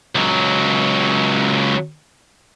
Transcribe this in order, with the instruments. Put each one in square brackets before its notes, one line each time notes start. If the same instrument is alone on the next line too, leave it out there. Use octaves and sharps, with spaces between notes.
[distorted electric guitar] C#2 F#3